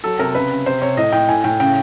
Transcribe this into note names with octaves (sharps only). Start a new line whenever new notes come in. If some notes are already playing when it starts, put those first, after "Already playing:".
F#3 A4
C3 A#4
C#3 B4
C#3
C3 C5
C3 C#5
A2 D#5
A2 G5
A2 G#5
A2 G5
C#3 G5